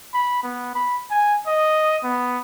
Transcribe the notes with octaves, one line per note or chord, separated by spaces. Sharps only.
B5
B3
B5
G#5
D#5
B3